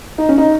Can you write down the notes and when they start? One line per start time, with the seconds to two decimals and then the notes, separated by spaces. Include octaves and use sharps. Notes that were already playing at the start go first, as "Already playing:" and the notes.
0.18 D#4
0.29 C#4
0.38 D#4